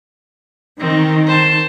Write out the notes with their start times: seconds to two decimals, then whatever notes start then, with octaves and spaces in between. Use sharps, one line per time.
0.80 D#3 C4 D#4
1.26 C5 A5